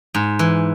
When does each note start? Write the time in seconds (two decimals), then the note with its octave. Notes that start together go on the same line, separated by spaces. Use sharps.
0.14 G#2
0.39 E3